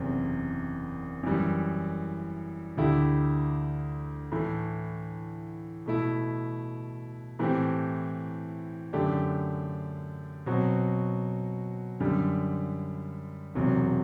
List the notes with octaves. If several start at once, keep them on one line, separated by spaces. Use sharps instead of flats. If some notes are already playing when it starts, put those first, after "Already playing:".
Already playing: F#1 E2 C3
F#2 E3 G3
D2 D3 A3 E4 G4
A2 E3 A3
B2 A3 E4
A2 E3 A3 C4 G4
F#2 D3 A3 D4 G4
B2 F#3 C4 F#4
F#2 D3 G3
E1 E2 C3 F#3